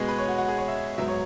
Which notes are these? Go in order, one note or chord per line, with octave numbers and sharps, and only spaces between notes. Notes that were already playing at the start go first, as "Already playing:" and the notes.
Already playing: B2 G#3 B3 G#4
B4
C#5
F#4
F#4
G#4
C#5
E5
G#2 F#3 B3 E5
C#5